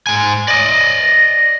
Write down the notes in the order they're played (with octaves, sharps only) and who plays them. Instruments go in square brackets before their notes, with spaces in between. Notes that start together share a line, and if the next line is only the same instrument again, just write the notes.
[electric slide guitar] G#2 G#5
[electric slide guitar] D5 D#5 [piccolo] A#6